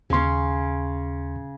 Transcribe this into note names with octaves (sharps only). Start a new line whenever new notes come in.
D#2 C#3 C#4 C6